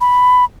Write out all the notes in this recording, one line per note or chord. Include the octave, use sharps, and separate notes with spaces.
B5